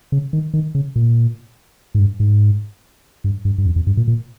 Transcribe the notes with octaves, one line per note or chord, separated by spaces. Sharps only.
C#3
D#3
D#3
C#3
A#2
G#2
G2
G#2
G2
G2
G2
F2
F2
G2
A#2
A#2